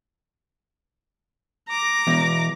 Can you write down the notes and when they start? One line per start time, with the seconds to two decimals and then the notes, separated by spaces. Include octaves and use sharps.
1.69 A#5 D6
2.07 E2 B2 E3